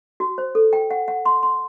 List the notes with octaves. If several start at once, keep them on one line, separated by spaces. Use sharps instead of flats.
F#4
C5
A4
G5
F#5
F#5
C6
C6